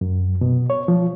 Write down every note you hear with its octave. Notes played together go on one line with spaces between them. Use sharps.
F#2
B2
C#5
F3